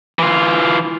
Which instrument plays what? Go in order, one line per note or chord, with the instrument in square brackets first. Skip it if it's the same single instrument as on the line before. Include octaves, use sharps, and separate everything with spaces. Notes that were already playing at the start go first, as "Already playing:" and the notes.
[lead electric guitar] E3 F4